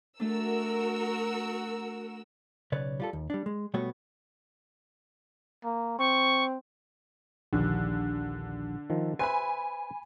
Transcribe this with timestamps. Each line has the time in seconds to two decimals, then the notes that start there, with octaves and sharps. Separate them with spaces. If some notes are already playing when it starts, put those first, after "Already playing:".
0.20 A3 D4 F#4 A#4 E6
2.72 B1 C#3 B4 C#5 D5
3.00 G3 F4 A4
3.13 D#2
3.30 G3 D4
3.46 G#3
3.74 B2 G3 A3 B3 F#4 C#5
5.64 A#3
5.99 C4 C#6
7.53 A#1 D#2 D3
8.90 D#3 F3
9.19 B4 C5 E5 G#5 B5